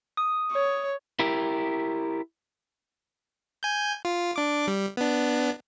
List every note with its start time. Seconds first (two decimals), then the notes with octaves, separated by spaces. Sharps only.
0.17 D#6
0.51 C#5
1.19 E4 G4 A#4
3.63 G#5 G6
4.05 F4
4.36 D4 D6
4.67 G3
4.97 B3 D4